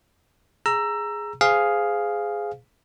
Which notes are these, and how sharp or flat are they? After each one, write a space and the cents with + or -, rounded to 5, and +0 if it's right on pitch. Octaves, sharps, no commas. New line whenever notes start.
G#4 +0 A#5 +0 E6 +20
G#4 +0 C5 -30 F5 +0